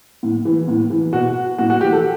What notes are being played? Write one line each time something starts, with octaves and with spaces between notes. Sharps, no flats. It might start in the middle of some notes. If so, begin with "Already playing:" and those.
A2
E3
A2
E3
B2 F#4
A2 F#4
F#4
E3 G4
A4